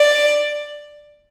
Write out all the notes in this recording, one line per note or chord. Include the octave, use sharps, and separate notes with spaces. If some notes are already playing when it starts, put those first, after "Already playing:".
Already playing: D5